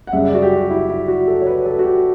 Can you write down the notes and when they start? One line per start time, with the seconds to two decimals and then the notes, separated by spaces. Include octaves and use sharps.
0.07 F#5
0.13 F#2 C#3 G3 E5
0.28 D5
0.34 F#4
0.42 G4
0.56 F#4
0.70 E4
0.89 E4
1.08 F#4
1.28 A4
1.42 C#5
1.46 B4
1.65 A4
1.79 F#4
1.84 G4